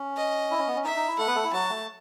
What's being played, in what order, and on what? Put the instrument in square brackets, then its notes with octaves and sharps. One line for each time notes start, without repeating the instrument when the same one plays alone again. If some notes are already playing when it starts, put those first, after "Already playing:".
Already playing: [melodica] C#4
[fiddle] D#5
[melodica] E4
C#4
B3
C#4
[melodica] D#4 [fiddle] E5
[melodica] D#4
E4
[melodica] A3 A4 [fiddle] F#5
[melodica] B3 B4
A3 A4
E4
[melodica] F#3 F#4 [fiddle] A5
[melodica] A3